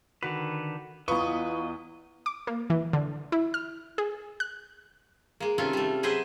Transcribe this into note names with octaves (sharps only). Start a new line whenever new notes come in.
D3 D#3 F#4 B4
E2 F4 B4 D#5 C#6 D#6
D6
A#3
E3
D3
E4
F6
G#4
F#6
G#3 A#3
C3 D#3 C#4 F4 A4
G3 A3
F#3 G#4 B4 C5 D#5 E5